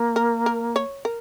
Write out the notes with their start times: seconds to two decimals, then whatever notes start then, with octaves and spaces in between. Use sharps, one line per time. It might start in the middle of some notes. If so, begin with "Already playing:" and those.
Already playing: A#3
0.16 A#4
0.46 A#4
0.76 C#5
1.05 A#4